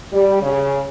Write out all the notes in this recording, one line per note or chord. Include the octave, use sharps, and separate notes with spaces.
G3
C#3